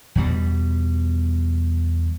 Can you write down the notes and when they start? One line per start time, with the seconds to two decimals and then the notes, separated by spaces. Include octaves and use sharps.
0.15 E2 B2 G3